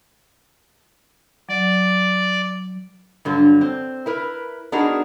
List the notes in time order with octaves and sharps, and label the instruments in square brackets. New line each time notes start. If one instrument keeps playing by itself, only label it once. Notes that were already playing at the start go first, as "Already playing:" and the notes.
[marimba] F#3 [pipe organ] D5
[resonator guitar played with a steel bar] G2 D3 F#3
C4
E4 A#4 B4
B3 D4 D#4 F#4 G#4 A#4